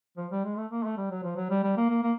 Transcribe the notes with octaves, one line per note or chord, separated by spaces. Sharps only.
F3
G3
G#3
A3
A#3
A3
G3
F#3
F3
F#3
G3
G3
A#3
A#3
A#3